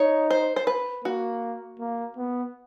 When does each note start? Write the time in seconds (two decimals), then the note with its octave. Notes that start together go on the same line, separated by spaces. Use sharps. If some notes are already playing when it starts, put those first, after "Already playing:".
Already playing: D#4 C#5
0.30 C5
0.56 C5
0.67 B4
1.05 A#3 F#4
1.80 A#3
2.17 B3